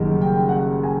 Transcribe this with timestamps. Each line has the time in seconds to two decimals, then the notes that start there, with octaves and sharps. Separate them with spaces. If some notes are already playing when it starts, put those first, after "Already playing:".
Already playing: F#1 F#2 D#3 G3
0.21 G5
0.49 F#5
0.83 G#5